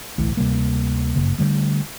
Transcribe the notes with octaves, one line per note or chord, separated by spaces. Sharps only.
D1 B1 E3 A3
D2 C3 G3 A#3
G1 F#2 C#3 A#3
D3 G3 A3